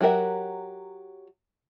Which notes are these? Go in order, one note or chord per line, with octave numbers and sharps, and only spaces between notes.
F#3 F#4 G4 A#4 E5